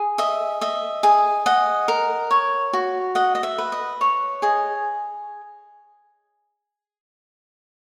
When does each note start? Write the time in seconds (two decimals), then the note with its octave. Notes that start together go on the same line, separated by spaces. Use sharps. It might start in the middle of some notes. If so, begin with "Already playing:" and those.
Already playing: G#4
0.18 D#5 E5
0.61 D#5 E5
1.03 G#4
1.46 D#5 F#5
1.88 A#4
2.31 C#5
2.73 F#4
3.15 D#5 F#5
3.35 D#5
3.43 E5
3.58 B4
3.72 D#5
4.01 C#5
4.42 G#4 D#5